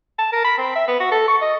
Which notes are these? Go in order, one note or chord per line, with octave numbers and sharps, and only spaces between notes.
A5
A#4
B5
C4
E5
B3
F#4
A4
C#6
D#5